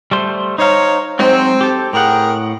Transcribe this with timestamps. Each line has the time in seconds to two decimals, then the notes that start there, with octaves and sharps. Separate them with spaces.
0.11 G3 A3 C5
0.58 D#4 C5 C#5 F5 A#5
1.19 F#3 G#3 C4 D#4
1.61 G4 A4
1.93 A2 G#4 A#4 F#5 G5